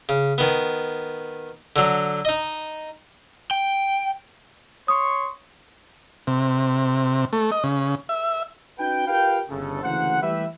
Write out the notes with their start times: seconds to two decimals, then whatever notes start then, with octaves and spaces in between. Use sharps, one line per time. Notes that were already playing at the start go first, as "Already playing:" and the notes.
0.09 C#3
0.38 D#3 B3
1.76 D3 F#3
2.25 D#4 D#5
3.51 G5
4.88 C#5 C6 C#6 D#6
6.27 C3
7.33 A3
7.52 D#5
7.64 C#3
8.09 E5
8.79 C#4 D#4 F#4 B4 G5
9.08 F4 G4 A#4 B4 F5 G5
9.50 G1 C#3 A4
9.83 D2 C#3 E3 A#3 C5 F#5
10.22 E3 G3 A3 G4 B4 E5